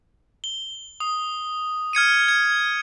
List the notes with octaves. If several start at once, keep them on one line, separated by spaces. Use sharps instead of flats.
G7
D#6
F6 G#6 C#7 D#7
G#6